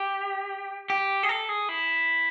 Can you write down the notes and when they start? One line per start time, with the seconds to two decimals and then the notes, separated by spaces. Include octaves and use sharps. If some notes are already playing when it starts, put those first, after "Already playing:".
Already playing: G4
0.90 G4
1.23 G#4
1.29 A4
1.49 G#4
1.69 E4